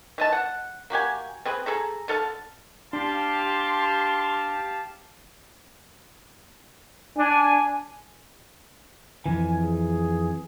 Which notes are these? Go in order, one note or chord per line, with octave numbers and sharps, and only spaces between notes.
E3 D#5 A5
F#5
A#3 F#4 G4 G#5
C4 G#4 B4
G#4 A4 A#5
D3 A4 F5 A5
D4 G4 F5 A5 C6
D4 G#5
F2 E3 G#5
G#4